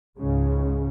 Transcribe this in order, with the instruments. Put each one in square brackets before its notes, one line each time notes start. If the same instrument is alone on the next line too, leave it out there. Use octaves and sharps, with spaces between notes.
[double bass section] C#2 G#2 C#3